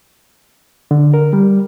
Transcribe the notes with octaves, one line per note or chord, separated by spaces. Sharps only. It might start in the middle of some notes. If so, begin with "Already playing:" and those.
D3
A#4
G3